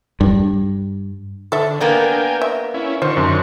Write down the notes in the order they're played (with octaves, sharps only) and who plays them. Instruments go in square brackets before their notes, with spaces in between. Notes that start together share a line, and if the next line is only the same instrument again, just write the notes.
[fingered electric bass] G2
[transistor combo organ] D3 [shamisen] A4 E5
[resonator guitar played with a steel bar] A#3 B3 D4 [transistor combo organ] A#4 G5 G#5
[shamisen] E5
[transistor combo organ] C#4 E4
[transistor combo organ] D3 D#3 C#6 [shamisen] F4 [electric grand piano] C5
[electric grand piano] F#2